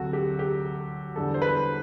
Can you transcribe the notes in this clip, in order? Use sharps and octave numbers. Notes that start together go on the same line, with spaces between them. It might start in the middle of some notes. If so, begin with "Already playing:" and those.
Already playing: D2 C3 F#3 F#4 A4
G4
G4
E2 D3 G3 A4
C5
B4